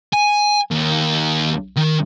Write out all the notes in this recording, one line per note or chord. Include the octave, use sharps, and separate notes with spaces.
G#5
D#2
D#3